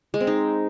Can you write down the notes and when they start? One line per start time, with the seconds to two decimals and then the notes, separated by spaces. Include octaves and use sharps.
0.14 G#3
0.20 C4
0.27 D#4